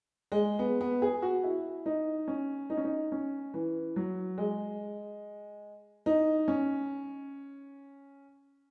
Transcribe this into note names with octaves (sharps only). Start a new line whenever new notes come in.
G#3
B3
B3
G#4
F#4
E4
D#4
C#4
D#4
C#4
D#4
C#4
E3
F#3
G#3
D#4
C#4